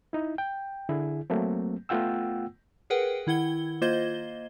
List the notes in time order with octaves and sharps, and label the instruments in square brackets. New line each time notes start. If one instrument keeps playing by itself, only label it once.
[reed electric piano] D#4 E4
G5
D3 E4 G#4
F#3 A3 A#3 C4
A3 B3 F4 F#5 G5 E6
[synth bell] G#4 A#4 B4 F#5 G5
D#3 E4 F#5 G#6 G7
A#3 F4 C5 D#5 G#6 G7